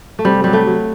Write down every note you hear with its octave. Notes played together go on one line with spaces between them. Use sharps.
A3
C3 G3
F#3 G3
A3
F#3